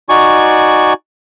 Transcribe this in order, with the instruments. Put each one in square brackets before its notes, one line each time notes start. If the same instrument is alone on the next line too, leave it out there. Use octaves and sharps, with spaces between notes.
[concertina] D#4 F#4 D5 G#5 C#6